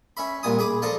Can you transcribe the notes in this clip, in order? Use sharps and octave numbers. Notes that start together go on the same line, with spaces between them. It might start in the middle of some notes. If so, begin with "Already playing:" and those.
C#4 E5 B5
C2 A#2 G#5 D#6
G#4 B5 D6
F3 D4 A4 A#5 D#6